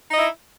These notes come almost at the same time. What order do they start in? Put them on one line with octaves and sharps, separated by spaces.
D#4 D#5 E4